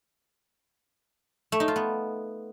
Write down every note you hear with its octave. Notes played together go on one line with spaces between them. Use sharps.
A3
D#4
F4
B3